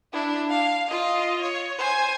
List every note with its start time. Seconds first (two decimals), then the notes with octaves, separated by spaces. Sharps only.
0.13 D4 E4
0.49 F5
0.88 F4 D#5
1.42 C#5
1.78 C5 G#5